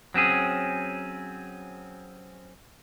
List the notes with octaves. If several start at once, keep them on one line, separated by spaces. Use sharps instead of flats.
F#3 C4 C#4 G#4